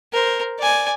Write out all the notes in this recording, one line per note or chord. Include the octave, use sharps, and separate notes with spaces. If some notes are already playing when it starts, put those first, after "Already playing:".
A#4 C5
D5 G#5